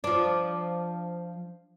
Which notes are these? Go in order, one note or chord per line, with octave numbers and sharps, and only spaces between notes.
F3 D4